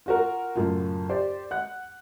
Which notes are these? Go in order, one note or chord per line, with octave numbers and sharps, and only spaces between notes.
F4 F#4 A#4
F#2 A2 C#3 F4
G4 C5 D5
F#5 F#6